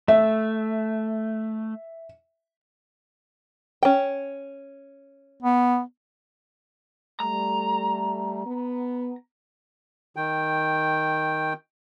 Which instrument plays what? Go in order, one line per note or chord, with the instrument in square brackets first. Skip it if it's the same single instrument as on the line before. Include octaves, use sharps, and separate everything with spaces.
[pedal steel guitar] A3 [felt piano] E5
[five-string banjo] C#4 G5
[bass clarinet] B3
[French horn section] G3 A3 [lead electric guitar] A#5
[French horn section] B3
[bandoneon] D#3 G5